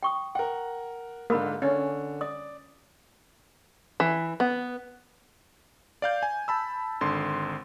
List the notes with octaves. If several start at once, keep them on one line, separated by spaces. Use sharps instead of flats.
G5 C#6 D#6
A#4 F#5 G5
G#2 D3 A#3 A#4 B5
D3 C#4
D5 D#6
E3
B3
D5 F5 G6
G#5
A5 B5 E6
G#1 D3 C6